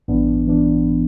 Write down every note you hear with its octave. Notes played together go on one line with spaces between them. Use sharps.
A1 G2 E3 B3 D4
E3 B3 D4